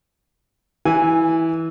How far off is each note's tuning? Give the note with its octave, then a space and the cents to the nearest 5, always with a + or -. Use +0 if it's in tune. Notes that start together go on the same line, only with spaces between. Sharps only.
E3 -10 G#5 +0